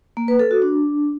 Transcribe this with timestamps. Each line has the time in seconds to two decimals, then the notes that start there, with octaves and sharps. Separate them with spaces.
0.17 A#3
0.28 B4
0.39 A4
0.51 F#4
0.62 D4